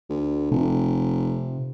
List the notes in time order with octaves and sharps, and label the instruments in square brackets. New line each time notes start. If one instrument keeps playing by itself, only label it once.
[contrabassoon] D2
[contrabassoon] F1 [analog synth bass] C3